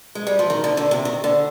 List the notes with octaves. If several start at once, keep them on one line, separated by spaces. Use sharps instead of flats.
G#3
G3
F3
D#3
D3
D3
C3
D#3
D3